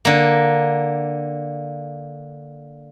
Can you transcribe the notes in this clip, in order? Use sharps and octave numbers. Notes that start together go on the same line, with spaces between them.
D3 A#3